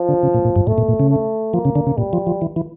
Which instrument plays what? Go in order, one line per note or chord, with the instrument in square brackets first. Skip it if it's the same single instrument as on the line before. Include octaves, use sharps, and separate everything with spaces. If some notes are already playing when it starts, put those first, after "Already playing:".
Already playing: [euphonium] F3
[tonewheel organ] D3
C#3
A#2
A#2
G2
[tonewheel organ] A2 [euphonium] A3
[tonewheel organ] A#2
A#2
C#3
[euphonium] A3
[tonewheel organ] F3 [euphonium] A#3
[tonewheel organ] C#3
D3
C#3
[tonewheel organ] A#2 [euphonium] G3
[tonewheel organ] F3
F3
E3
E3